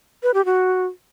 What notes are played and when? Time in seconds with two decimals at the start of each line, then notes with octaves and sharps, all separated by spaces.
0.23 B4
0.34 G4
0.45 F#4